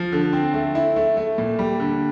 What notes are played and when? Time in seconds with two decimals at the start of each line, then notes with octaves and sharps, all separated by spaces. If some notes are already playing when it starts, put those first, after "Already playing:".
Already playing: F3
0.12 D3
0.33 C4
0.54 A3
0.75 E4
0.96 A3
1.17 A3
1.38 A#2
1.59 G3
1.80 D3